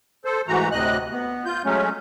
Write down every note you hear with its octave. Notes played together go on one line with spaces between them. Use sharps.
A4 C5
G#2 E3 A3 F#4 A#5
D2 A2 C3 D#5 F#6
B3
F4 G6
F#3 G#3 A3 C#4